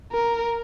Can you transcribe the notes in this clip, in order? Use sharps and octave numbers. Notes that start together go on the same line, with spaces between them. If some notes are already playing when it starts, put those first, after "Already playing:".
A#4